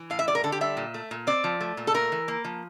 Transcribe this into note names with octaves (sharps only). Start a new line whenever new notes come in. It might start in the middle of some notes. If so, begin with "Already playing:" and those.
Already playing: E3
A2 F5
E5
G3 D5
A#4
D3 A4
G4
G3 E5
A#2
A3
A#2
C4 D5
F3
A3
A#2
A4
A3 A#4
E3
A#3
F3